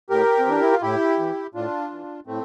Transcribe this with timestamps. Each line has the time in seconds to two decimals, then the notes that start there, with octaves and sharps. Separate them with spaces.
0.10 A2 G4 A#4
0.39 C4
0.46 E3 D4
0.61 E4
0.71 F4
0.82 A2 E4 G4
1.19 E3
1.54 A2 D4 F4
1.91 E3
2.26 A2 A3 C4